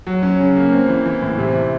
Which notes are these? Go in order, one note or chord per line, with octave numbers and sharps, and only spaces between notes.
F#3
C#4
C#3
A#3
C4
E3
E3
A2
C3
E3